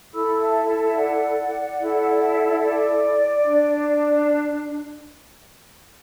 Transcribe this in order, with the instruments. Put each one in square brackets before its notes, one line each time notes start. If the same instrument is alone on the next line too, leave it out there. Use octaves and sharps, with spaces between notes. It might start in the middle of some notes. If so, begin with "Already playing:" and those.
[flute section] E4 A4 B5 E6
E5 A5
E5 A5
D5 F#5
E4 A4
D5
D4